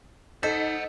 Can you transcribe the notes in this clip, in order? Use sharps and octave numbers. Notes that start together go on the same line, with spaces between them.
D#4 A4 C5 D#5 F#5 B6